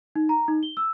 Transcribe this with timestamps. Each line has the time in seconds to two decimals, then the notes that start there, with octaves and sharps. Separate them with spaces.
0.16 D#4
0.29 A#5
0.48 D#4
0.63 G7
0.77 E6